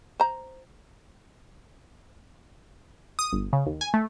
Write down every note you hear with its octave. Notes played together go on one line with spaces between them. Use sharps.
C5 A#5
D#6
G1
C#3
D#2
G#5
A3